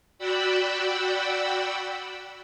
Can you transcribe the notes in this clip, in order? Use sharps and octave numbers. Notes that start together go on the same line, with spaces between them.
F#4 D5 F#5 G5 B5 E6